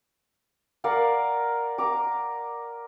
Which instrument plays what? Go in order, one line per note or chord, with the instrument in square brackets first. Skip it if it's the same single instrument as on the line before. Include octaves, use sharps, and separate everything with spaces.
[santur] A#4 D5 F5 F#5
A#5 D6